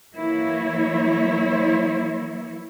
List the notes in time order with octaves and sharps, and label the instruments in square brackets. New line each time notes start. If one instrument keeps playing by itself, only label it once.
[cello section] E3 F#3 A#3 E4 C#5